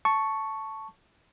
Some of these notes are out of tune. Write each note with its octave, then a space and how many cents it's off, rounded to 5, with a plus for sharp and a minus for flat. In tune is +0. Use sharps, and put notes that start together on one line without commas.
A5 +0 C#6 +0